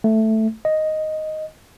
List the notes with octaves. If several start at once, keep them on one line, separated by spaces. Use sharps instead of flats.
A3
D#5